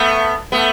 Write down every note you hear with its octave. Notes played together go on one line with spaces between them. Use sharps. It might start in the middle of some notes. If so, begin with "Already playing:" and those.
Already playing: A3 B3
A3 B3